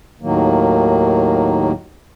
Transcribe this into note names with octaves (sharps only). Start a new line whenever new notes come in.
D#2 A2 D#3 F#3 A#3